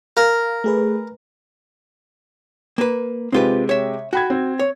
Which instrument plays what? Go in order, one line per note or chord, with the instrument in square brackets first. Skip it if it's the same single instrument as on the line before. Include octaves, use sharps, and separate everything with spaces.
[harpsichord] A#4 [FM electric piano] F5
[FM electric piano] A3 G#4 B4
[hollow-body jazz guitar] A#3 B4
[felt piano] C3 G#3 G4 [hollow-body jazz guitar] C4 F4 B4
[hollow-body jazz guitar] C#5 E5
[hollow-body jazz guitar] F#4 [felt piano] G5 B5 G#6
[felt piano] C4
[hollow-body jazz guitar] C#5